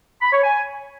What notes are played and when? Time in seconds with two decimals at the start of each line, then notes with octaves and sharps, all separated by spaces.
0.22 B5
0.33 C#5
0.44 G#5